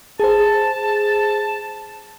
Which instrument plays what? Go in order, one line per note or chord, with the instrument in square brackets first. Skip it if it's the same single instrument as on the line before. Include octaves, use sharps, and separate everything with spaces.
[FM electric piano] G#4 C5 [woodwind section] A5